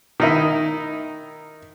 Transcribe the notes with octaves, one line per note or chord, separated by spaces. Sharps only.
D#3 D#4 E4